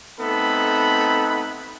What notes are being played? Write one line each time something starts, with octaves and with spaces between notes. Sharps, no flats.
A3 B3 C4 D#4 A4 B5